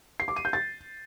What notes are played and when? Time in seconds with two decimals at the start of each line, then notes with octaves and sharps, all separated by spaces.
0.20 C7
0.28 D6
0.36 D#7
0.45 G6
0.53 A6